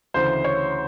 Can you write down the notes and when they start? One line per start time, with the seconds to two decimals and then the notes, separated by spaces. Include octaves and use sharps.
0.14 D2 C#3 E3 C5
0.44 C#5